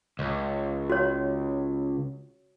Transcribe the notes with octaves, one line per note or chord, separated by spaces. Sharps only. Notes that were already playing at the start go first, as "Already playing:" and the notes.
C#2
F#4 C#5